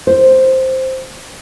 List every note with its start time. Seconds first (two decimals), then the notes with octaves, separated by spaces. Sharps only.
0.07 C5